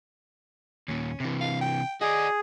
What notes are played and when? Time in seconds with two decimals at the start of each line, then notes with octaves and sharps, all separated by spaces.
0.88 D#2 A#2 C#4
1.20 C3 E3
1.41 F5
1.61 G5
2.01 F#4 G#4 D5 D#5